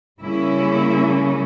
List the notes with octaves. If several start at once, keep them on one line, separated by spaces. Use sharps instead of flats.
C#3 G3 A#3 C#4 E4